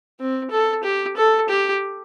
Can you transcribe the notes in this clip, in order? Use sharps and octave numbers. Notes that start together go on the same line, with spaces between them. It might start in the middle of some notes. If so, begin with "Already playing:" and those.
C4
A4
G4
A4
G4